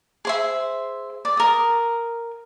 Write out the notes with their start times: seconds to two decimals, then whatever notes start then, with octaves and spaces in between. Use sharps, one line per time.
0.25 G#4 C5 E5
1.25 D5
1.37 A#4 D#6